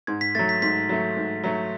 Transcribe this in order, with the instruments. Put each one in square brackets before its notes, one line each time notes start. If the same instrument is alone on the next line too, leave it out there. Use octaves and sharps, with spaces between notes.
[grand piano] G#2 [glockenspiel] G#6
[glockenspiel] B6
[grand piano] F#3 A3 [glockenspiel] A6
[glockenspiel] B6
[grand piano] G#2 [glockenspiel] B6
[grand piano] F#3 A3
G#2
F#3 A3